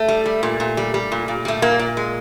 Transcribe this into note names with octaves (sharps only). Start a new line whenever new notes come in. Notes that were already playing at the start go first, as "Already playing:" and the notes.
Already playing: A3
G3
G3
A#2
A#2
G3
G3
A#2
A#2
G3 A3
A#2 A#3
A#2
G#3